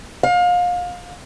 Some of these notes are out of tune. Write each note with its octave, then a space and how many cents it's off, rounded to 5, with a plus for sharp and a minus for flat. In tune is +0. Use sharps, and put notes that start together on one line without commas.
F5 +30